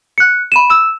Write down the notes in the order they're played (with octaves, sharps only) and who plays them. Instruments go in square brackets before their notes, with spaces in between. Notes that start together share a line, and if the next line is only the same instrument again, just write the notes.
[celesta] F#6 C#7
B5 D#7 E7
E6 E7